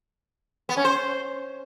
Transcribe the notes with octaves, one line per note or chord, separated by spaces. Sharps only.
B3
C#4
C5